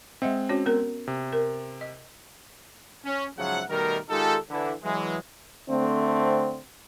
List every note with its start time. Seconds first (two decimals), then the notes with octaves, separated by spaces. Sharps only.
0.22 G#3 C4 D#5 E5 F#5
0.49 C#4 F#4 C#5
0.66 B3 A#4 A#5
1.07 C3
1.33 A#4
1.81 D#5
3.05 C#4
3.38 G#2 C#3 F3 F#3 E5 F#5
3.70 B2 D#3 G3 A3 A#4
4.10 D#3 G#3 D#4 F4 G4 A4
4.50 D3 E3 E4
4.84 E3 F#3 G#3
5.68 D3 A3 C4